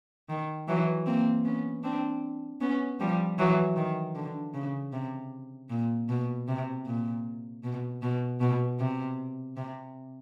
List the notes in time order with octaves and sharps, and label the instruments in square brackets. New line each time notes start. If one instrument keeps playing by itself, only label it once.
[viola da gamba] D#3
E3 F#3
A#3 C4
B3 C#4
C4 D4
B3 C#4
F3 G3
E3 F#3
D#3
D3
C#3
C3
A#2
B2
C3
A#2
B2
B2
B2
C3
C3